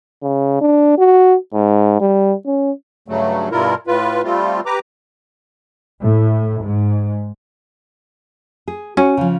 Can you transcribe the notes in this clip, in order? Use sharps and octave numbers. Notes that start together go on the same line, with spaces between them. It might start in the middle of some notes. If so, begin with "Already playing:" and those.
C#3
D4
F#4
G#2
G3
C#4
G2 C#3 F#3 A3
G2 B2 G3 E4 F4 A#4
A2 F4 B4
G3 A3 C4 F4
G4 B4 A#5 D6
A2
G#2
G#4
C#4 F#4
C#3 F3